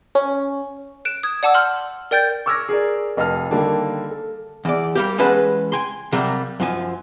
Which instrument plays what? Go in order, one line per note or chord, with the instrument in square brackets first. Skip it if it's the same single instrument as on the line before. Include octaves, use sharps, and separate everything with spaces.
[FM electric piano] C#4
[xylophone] F#6 D7 E7
D#6 G#6
D5 F#5 A5 D6 E6
C6 F6 G6 F#7
A#4 D5 G5 G6 A6
[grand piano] C#6 D6 E6 F6 G#6 A#6
G#4 A#4 D5
F1 D#5 F5 A5 F6
D3 D#3 G3 A#3 D4
A4
[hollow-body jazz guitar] E2 D5
G3 A#3 G4
E2 G#3 C#4 B4 F#5 A5
G5 G#5 C6
C3 F#3 G3 A#3
F#2 F3 G#5